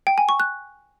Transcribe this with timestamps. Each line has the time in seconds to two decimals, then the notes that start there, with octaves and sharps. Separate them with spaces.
0.07 G5
0.18 G#5
0.29 C#6
0.40 F#6